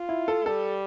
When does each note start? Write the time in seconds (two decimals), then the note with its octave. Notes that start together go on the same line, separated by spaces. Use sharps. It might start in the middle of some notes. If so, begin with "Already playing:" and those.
Already playing: F4
0.09 E4
0.28 A4
0.46 G3 A4